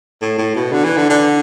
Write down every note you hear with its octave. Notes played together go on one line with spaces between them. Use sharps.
A2
A2
B2
D3
E3
D3
D3